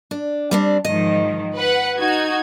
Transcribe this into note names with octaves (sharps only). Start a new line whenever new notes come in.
D4
G3 C4 D4
G#2 D#3 F3 D#5
B4 F#5
D#4 F#4 G#6